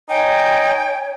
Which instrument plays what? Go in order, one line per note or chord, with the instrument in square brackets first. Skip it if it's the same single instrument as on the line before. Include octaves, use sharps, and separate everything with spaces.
[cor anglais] D#4 [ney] C#5 [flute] G5 [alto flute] G#5